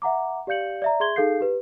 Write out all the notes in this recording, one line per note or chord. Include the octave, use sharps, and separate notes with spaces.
E5 F#5 A#5 D6
G4 D5 F5 G6 C#7 F#7
D5 E5 A#5
G#4 E5 C6 G#6 G7
D#4 G#4 A4 F5 G6 C7
G4 B4